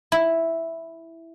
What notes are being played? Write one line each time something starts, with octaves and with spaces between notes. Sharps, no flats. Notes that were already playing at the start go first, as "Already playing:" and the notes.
E4